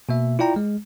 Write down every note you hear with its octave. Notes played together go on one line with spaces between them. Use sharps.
B2 A#3 E5
E4 F4 D5 G5 A#5
G#3